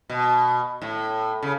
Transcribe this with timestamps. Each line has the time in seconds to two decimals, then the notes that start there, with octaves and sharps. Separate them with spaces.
0.10 B2
0.82 A2
1.43 C#3